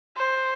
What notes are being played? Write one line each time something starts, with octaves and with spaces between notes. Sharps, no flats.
C5